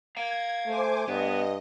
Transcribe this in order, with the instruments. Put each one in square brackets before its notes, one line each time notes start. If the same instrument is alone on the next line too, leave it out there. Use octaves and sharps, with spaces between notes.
[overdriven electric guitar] F5 A#5 [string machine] G#6
[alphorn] A3 [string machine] C5 G#5 D6
[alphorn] G2 [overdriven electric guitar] B3 [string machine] D#5